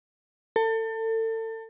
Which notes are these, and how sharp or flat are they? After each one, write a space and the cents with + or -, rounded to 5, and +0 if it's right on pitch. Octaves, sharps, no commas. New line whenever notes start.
A4 +30